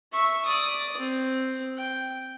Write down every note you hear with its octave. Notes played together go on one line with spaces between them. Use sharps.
E5 C#6
D5 D#6
C4
G5